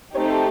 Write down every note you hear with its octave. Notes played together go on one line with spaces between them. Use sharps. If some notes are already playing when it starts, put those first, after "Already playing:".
A3 C4 D#4 G4 C#5